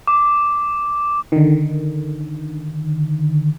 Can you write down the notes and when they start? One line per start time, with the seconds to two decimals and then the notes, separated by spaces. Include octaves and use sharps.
0.07 D6
1.32 D3 D#3